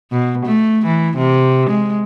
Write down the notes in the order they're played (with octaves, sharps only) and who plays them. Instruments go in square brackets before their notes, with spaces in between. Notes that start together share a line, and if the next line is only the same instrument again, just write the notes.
[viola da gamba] B2
A3
E3
C3
G#3